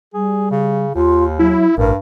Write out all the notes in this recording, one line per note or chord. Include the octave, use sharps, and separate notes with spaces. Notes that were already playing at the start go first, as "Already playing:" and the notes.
G3 G#4
C#3
D#2 F4
F#3 E4
A1 G2 A#4